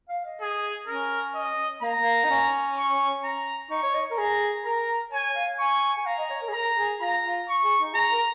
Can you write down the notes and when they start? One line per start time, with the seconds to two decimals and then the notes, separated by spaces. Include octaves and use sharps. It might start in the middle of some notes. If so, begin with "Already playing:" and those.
0.09 F5
0.25 D#5
0.41 G#4
0.88 C#4 A#4
1.35 D#5
1.82 A#3 A#5
2.01 A#3
2.24 D#4
2.30 C#4
2.77 C#6
3.24 A#5
3.70 D#4 C#6
3.83 C#5
3.94 D#5
4.11 A#4
4.18 G#4 A#5
4.65 A#4 A#5
5.12 C#5 G#5
5.35 F5
5.59 G#5 C#6
5.97 G#5
6.06 F5 A#5
6.18 D#5
6.30 C#5
6.42 A#4
6.48 G#4
6.54 A#4 A#5
6.77 G#4
7.01 F4 A#5
7.25 F4
7.48 C#6
7.64 G#4
7.80 D#4
7.95 G#4 A#5
8.11 A#4